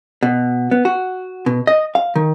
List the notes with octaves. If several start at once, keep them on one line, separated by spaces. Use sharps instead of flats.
B2
B3
F#4
B2
D#5
F5
D#3